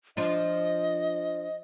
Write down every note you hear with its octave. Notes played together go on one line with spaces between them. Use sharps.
F3 D4 F4 D#5